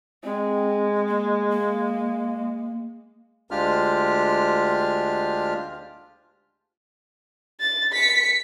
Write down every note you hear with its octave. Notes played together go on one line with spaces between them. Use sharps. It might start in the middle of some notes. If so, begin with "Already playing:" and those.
G#3 C4
A#3
A#3
D2 G#3 D4 F4 G4 F6
A6
B6 C#7